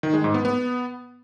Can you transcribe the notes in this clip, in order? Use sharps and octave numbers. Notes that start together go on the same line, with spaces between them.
D#3
G#3
G#2
B3
B3